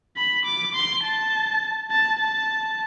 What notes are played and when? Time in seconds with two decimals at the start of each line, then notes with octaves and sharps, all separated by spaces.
0.17 B5
0.45 D6
0.74 C6
1.04 A5
1.91 A5
2.19 A5